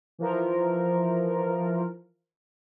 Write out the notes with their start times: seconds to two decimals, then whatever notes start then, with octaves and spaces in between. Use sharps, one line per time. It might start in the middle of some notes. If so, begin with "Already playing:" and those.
0.19 E3 F3 F4 A#4